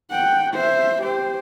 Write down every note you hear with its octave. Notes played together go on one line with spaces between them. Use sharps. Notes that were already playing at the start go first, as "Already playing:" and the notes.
F#5 G5
C5 E5
G4 C5